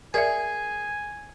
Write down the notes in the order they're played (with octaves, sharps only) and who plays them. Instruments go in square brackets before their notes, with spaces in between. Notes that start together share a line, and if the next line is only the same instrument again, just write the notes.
[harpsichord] G#4 [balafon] A#4 D5 E5 [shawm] G#5